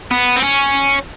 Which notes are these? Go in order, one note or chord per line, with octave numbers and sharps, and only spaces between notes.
B3
C4
C#4